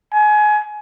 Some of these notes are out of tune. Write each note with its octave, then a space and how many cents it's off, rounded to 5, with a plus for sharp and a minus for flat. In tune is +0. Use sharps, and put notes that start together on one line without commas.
G#5 +25